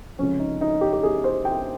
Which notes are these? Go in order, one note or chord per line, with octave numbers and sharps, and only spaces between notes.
C#2 C3 F3 C#4
D#4
D#4
G4
G4
G#4
C5
G5